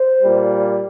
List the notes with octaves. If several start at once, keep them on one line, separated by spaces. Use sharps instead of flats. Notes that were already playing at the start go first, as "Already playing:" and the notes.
Already playing: C5
A#2 G3